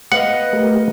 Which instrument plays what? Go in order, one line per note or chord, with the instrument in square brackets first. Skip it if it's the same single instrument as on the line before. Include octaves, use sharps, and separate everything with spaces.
[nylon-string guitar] B3 B4 F5 [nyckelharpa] D#5 [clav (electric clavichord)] F#5
[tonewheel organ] A3 G4 A#4